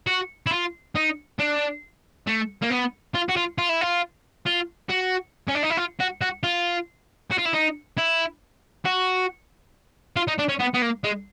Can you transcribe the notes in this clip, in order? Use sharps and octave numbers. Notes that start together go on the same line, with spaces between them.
F#4
E4
F4
D#4
D4
A3
A#3
B3
F4
F#4
F4
F4
E4
F4
F4
F#4
C#4
D4
D#4
E4
F4
F#4
F#4
F4
F#4
F4
E4
D#4
E4
F#4
F4
D#4
D4
C#4
B3
B3
A#3
G#3